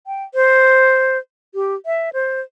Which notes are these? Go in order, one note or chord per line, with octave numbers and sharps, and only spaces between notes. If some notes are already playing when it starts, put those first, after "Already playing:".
G5
C5
G4
E5
C5